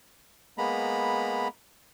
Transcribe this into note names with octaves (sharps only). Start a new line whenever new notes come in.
G#3 A#3 B3 A#5 B5